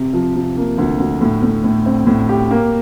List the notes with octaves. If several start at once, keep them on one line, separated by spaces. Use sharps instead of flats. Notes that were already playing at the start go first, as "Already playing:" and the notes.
Already playing: C3
F3
C3
A#3
D2
D2
A2
A2
A2
C4
A2
G4
A#3